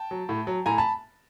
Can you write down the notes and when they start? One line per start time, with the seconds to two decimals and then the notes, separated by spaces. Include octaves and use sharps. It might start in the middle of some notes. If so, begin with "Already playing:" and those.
Already playing: G5 A5
0.11 F#3
0.29 A2
0.47 F#3
0.66 A2 G#5 A#5
0.78 A5 B5